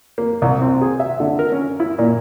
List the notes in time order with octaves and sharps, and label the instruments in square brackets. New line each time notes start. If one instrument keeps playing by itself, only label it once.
[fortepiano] A#3
C2
C4
G#4
E5
D3
A#4
C#4
E4
A#2